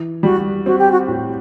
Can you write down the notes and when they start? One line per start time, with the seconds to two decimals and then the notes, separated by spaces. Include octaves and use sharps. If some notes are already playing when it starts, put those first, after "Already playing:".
Already playing: E3
0.23 G3 F#4
0.66 C4 F#4
0.78 G4
0.92 F#4
1.08 A2